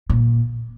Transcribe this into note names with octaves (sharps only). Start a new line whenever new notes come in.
A#2